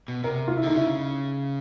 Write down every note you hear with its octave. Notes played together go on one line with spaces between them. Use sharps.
B2
C3 A#4
F4
E4
D3 D#4
C#3 E4